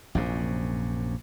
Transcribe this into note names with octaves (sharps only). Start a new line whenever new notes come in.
A#1 F#2 C3